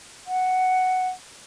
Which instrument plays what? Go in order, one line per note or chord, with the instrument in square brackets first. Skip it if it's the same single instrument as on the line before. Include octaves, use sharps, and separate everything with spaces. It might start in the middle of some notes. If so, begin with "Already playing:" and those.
[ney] F#5